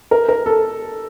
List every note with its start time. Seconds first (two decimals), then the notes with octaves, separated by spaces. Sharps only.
0.11 A#4
0.29 A#4
0.46 A4